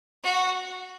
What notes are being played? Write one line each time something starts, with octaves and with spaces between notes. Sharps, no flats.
F#4